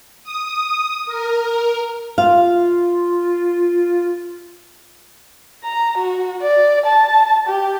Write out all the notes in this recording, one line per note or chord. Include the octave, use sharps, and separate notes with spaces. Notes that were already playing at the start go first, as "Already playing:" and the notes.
D#6
A#4
F4 F5
A#5
F#4
D5
A5
G4